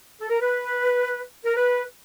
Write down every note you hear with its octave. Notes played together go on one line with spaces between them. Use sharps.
A4
A#4
B4
A#4
B4